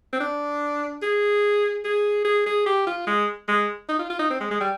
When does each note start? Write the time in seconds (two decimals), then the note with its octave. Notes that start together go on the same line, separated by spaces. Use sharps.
0.13 C4
0.20 D4
1.02 G#4
1.84 G#4
2.25 G#4
2.46 G#4
2.66 G4
2.87 F4
3.07 G#3
3.48 G#3
3.89 D#4
3.99 F4
4.10 F4
4.19 D#4
4.30 C4
4.41 G#3
4.51 G#3
4.61 G3